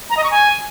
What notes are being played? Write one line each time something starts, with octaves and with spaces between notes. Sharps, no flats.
A#5
D#5
C#6
G#5